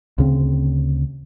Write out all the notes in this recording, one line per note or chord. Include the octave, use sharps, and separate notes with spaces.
D2 C#3 C4